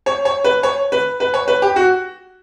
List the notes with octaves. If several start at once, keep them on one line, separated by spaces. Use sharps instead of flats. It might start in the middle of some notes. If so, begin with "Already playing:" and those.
C#5
C#5
B4
C#5
B4
B4
C#5
B4
G4
F#4